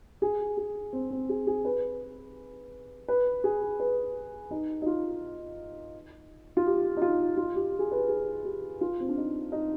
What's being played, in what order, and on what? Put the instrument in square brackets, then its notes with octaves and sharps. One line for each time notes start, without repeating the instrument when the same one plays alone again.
[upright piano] G#4
G#4
C4
C4
G#4
G#4
B4
B4
G#4
B4
D#4
D#4
F4
F4
G4
D#4
F4
F4
G4
G#4
B4
G#4
G4
F4
C4
D4
D#4
D#4